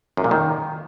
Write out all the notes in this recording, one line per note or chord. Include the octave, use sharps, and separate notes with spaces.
F#2
A#2
D#3